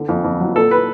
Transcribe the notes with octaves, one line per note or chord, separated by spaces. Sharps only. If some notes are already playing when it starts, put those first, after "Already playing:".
Already playing: D3
F2
F2
F#3
A#2 A4
B4